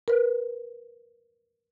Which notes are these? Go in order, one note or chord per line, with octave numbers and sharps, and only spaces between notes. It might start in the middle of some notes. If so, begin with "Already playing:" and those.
A#4 B4